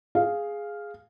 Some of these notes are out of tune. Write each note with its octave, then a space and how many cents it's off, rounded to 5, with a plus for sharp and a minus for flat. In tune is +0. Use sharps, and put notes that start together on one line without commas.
G#4 +0 F5 +0